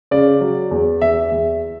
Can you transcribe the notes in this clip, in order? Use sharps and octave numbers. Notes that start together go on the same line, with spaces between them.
C#3 D5
F#3
E2
E2 E5
E2